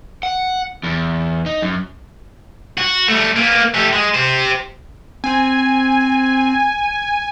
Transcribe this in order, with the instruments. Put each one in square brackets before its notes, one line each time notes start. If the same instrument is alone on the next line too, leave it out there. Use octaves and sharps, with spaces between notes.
[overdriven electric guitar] F#5
E2
D#4
F#2
[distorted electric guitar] F#4
G3 A3
A#3 B3
A3 G4
G#3
G4 C5
[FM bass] C4 [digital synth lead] G#5